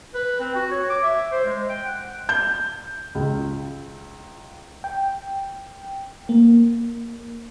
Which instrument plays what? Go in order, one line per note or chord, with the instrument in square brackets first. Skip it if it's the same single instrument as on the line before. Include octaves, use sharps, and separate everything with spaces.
[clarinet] B4
C4
F#4
C#5
D6
E5
C5
G#3
G5
F#5
[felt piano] G6
C#2
[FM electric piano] G5
A#3